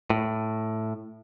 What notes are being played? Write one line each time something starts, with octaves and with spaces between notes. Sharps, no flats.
A2